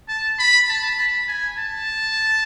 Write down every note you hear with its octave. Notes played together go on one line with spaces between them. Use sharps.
A5
B5
A5
B5
G#5
A5